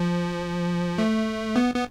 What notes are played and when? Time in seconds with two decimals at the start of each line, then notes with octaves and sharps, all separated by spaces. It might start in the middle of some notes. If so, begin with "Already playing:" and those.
Already playing: F3
0.98 A3
1.56 B3
1.74 B3